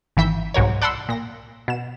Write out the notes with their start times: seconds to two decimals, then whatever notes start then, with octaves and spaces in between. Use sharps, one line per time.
0.17 G#1 E3 E5 G6
0.54 C2 G#2 F#3 A#4 C#5
0.82 D5 F#5 A5 B5 C6 E6
1.09 A#2 A#6
1.68 B2 E7